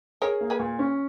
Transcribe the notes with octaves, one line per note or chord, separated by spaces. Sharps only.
G#4 A#4 C#5
A#3
G#4 B4
A#2
C#4